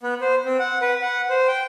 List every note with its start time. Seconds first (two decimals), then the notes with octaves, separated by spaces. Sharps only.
0.03 B3
0.21 C5
0.45 C4
0.59 F#5
0.82 B4
1.02 F#5
1.29 C5
1.48 G5